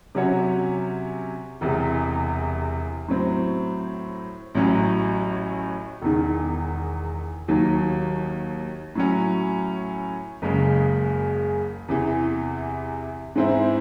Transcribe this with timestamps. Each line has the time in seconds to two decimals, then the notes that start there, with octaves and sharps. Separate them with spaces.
0.15 C3 F#3 C#4 F#4 C#5
1.61 E1 E2 C3
3.08 A2 F#3 C4
4.55 A1 A2 F#3 C#4
6.02 E1 E2 D#3
7.48 D#2 D#3 F#3
8.95 A2 F#3 C#4
10.42 F#1 F#2 C#3 G#3
11.88 E2 C3 E3
13.35 G#2 E3 C4 E4